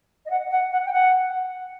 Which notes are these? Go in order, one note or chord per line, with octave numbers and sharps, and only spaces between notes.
D#5
F#5
F#5
F#5
G5
F#5